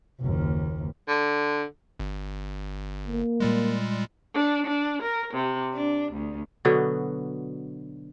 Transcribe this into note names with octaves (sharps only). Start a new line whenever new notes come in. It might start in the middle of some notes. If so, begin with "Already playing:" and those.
F#1 D#2
D3
G1
A#3
A#2 G3 G#3
D4
D4
A#4
C3
D4
D2
B2 D3 F#3 B3